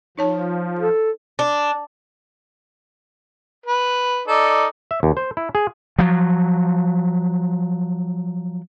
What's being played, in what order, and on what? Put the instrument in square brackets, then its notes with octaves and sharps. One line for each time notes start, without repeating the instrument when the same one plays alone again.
[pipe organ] F3 [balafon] D#4 C#5 A5
[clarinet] A4
[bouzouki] D4
[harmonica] B4
D#4 A4 D5
[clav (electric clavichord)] E5
D#2
C5
E4
G#4
[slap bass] F3 F#3